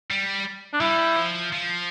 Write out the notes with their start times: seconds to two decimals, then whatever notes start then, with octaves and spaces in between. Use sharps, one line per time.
0.11 G3
0.73 D4
0.81 G3 E4
1.16 F3
1.52 F3